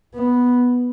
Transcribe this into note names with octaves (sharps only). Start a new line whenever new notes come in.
B3